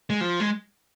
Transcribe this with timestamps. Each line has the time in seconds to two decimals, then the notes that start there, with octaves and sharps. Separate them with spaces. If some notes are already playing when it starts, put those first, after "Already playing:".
0.10 G#3
0.21 F3
0.40 G#3